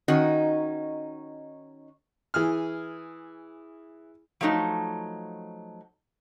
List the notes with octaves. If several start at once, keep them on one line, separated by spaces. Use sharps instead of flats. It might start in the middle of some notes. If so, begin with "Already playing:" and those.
D#3 C#4 D#4 F#4 D#5
E3 G#4 F6
F3 F#3 A3 D#4